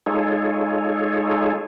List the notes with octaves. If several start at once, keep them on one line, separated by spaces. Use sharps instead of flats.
G#3 D#4 F4 G#4 A4 C#5